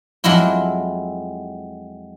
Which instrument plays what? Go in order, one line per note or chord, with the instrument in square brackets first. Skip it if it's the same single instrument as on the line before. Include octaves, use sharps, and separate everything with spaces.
[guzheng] F2 F#3 G#3 E4 F4